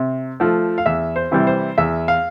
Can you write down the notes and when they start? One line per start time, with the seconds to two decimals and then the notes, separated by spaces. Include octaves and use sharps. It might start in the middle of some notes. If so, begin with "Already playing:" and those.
Already playing: C3
0.40 F3 A3
0.78 F5
0.86 E2 E5
1.16 C5
1.31 C3 E3 G3
1.47 C5
1.78 E2 E5
2.08 F5